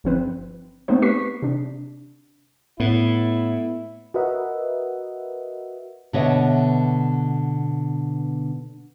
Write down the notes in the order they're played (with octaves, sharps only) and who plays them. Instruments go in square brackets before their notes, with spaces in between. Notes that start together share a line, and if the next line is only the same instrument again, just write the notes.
[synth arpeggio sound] G1 F3 C4 B4
A3 B3 C4 D#4 C5
G4 B4 C#6 B6 C7
C3 D4
[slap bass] A2 [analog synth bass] B3 [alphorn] E4
[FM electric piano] F#4 A#4 B4 D#5 E5 F#5
[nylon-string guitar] B2 D3 B3 C#5 D#5 E5